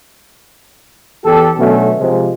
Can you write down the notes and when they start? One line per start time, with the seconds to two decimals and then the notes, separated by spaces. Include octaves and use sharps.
1.25 E2 G4 A4
1.58 B2 D3 F#3 A3 B3 C#4
2.00 C3 F3 G#3